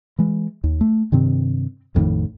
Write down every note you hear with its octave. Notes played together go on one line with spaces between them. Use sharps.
E3 G#3
D#2
A3
G2 C3 D#3 C4
A1 F2 A2 D#3